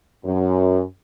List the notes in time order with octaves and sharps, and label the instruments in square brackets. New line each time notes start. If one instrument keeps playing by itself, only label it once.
[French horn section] F#2